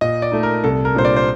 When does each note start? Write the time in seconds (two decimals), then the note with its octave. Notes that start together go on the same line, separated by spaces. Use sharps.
0.01 A#2 D#5
0.22 D5
0.32 A3 D#4
0.43 A#4
0.64 C2 A4
0.85 A#4
0.94 A#2 G3 D4 C5
1.05 D5
1.16 C5